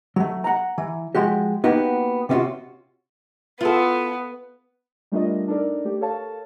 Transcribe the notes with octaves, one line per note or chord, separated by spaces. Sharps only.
F#3 A3
F#5 A#5
E3
F3 G#3 F#4 G4
A#3 B3 D#4 F#4 G4
C3 B3 C#4 D#4 F4 F#4
B3 F4 A4
G3 A3 D4 F4 A#4 D#5
D4 D#4 A4 A#4 D5
A3 G4
A4 A#4 C#5 F5 A5